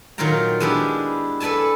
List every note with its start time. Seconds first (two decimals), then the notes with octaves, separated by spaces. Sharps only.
0.18 A#2 D#3 F#3 F4 G5 A#5
0.60 G#3 B3 D4 E4 G4
1.40 A4 B4 D5 G#5 A5